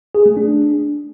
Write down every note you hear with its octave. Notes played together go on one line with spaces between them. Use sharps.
G#4
A3
D4